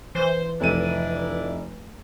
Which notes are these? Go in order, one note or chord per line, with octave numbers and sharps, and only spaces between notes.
E3 C5
F1 D4 E4 D#7